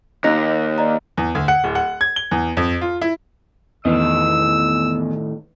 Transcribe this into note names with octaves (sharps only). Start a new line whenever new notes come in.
D#2 D#4 F#6 A#6
D5 D#5 A#5
E2
D2
F#5
D1
F#5
G#6
G7
E2
F2
F4
E4
E2 A2 D#3 D#5 E6